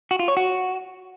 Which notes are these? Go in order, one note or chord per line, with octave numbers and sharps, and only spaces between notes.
F#4
F4
C#5
F#4